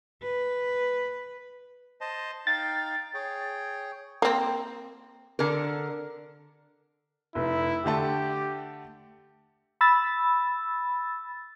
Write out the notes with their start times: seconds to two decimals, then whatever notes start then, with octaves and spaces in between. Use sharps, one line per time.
0.22 B4
2.01 C5 D#5 A5
2.47 D#4 F5 G5 A6
3.14 G#4 C#5 G5
4.22 A#3 C4
5.39 D3 A#4
7.35 F1 E4
7.86 D3 A3 G4 A5
9.81 B5 E6 A6